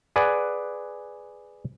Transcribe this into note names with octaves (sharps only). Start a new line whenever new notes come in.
G#4 B4 D5 F#5 G#5